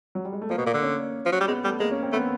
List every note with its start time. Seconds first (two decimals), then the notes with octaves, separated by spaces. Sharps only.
0.15 F#3
0.25 G3
0.32 G#3
0.42 A3
0.50 F3 A#3
0.58 B2
0.66 A#2
0.74 D3
0.83 C#4
1.26 F3
1.32 F#3
1.41 G3
1.48 G#3 B3
1.64 G3 A3
1.80 G#3 A#3
1.91 C#4
2.03 C4
2.13 A3 B3